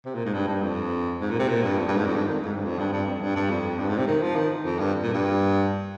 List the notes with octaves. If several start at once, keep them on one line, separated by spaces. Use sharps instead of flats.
C3
A#2
G#2
G2
G2
F2
G#2
A#2
C3
A#2
G2
F2
G2
G#2
F2
G2
D#3
G#2
G2
F2
G2
G2
F2
G2
G2
F2
G2
G#2
C3
D#3
F3
D#3
F2
G2
A#2
G2